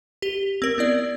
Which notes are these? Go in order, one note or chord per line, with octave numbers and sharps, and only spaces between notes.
G4 G7
C4 A#4
B3 E4 D5